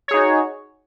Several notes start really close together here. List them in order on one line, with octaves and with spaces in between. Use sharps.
C#5 G#4 D#4 F#4